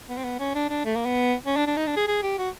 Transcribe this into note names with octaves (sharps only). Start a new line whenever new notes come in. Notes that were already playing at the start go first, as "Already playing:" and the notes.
B3
C4
B3
C#4
D4
D4
A3
A#3
B3
C#4
D4
D4
D#4
D4
G#4
G#4
G4
F#4